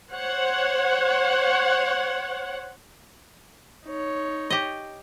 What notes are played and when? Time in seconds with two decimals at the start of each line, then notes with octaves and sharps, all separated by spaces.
0.12 C5 C#5 F#5
3.86 D#4 C#5
4.50 G4 D#5